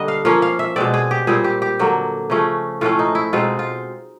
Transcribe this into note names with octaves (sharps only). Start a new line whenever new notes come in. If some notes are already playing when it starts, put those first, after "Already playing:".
Already playing: D3 G3 A#3 D4 D#5
F5
F3 A#3 C#4 F5
F5
E5
B2 G#3 C4 D5
G#4
G4
A#2 G3 C4 G#4
G4
G4
D3 F#3 A#3
C#3 F3 A3 C#4
A2 F3 A3 C#4 F4
D#4
E4
B2 G#3 C4 D#4 F4
F4